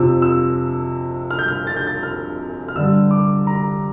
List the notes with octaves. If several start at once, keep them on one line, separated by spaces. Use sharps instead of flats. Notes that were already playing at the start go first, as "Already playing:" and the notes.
Already playing: F2 C3 F3 E6
E6
F6
G6
F6
A6
G6
A6
F6
F6
G2 D3 G3 E6
D6
A#5